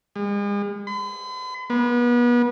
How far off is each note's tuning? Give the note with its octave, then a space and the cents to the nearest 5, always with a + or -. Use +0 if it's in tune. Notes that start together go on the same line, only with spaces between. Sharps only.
G#3 -40
B5 +45
B3 -35